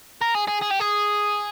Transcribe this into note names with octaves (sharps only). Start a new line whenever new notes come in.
A#4
G#4
G#4
G#4
G4
G#4